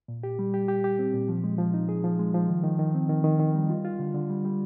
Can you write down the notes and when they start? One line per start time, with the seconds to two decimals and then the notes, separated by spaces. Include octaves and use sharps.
0.08 A#2
0.23 G4
0.39 G3
0.54 G4
0.68 G4
0.84 G4
0.99 C4
1.14 A#2
1.29 F3
1.44 G#3
1.58 F3
1.74 D#4
1.89 G#4
2.04 F3
2.19 G#3
2.34 F3
2.49 D#3
2.64 D#3
2.79 D#3
2.94 C4
3.09 D#3
3.24 D#3
3.39 D#3
3.55 G3
3.69 F4
3.85 F4
3.99 D3
4.15 D3
4.30 G3
4.45 G3